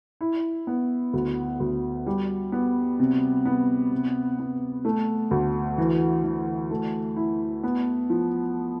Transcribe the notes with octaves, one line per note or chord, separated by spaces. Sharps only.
E4
B3
D2
D2
G3
B3
C3
B3
C3
B3
A3
D2
E3
E3
A3
E4
B3
F3